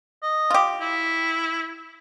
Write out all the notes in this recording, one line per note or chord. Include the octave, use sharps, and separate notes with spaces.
D#5
F4 G4
E4